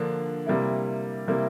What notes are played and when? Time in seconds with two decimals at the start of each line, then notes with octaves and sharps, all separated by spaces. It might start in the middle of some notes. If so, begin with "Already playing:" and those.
Already playing: D3 F3 A#3 D4
0.46 C3 G3 A#3 E4
1.27 C3 G3 A#3 E4